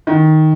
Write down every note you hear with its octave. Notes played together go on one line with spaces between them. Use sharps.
D#3